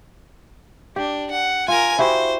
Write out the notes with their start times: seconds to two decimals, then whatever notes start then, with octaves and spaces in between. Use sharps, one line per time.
0.96 D4 G4
1.31 F#5
1.68 F4 A#4 G#5
1.99 E4 F#4 G4 C5